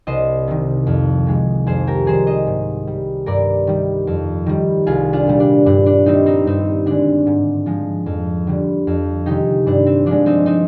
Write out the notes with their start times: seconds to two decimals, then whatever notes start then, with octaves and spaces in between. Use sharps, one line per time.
0.07 C2 C5 D#5
0.48 C3 D#3
0.87 F2
1.27 D#3 G#3
1.66 F2 G#4 C5
1.87 G4 A#4
2.06 D#3 G3 G#4 C5
2.27 C5 D#5
2.47 G#2
2.87 G3
3.26 G2 A#4 D5
3.67 D#3 G3
4.07 F2
4.46 D#3 G3
4.87 C2 F4 G#4
5.13 D4 F4
5.27 A#2 G3
5.40 D4
5.66 G2 D4
5.86 D4
6.06 D#3 G3 C4 D#4
6.26 C4 D#4
6.47 G2 C4 D#4
6.86 D3 G#3 D4
7.27 G#2
7.66 F3 G#3
8.06 F2
8.47 D3 G3
8.87 F2
9.26 C3 D#3 G#3 D#4 G4
9.66 G2 D4
9.86 C4
10.06 F3 G#3 D4
10.26 C4 D#4
10.46 C4 D#4